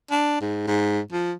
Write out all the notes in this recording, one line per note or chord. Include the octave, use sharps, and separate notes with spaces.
D4
G#2
G#2
F3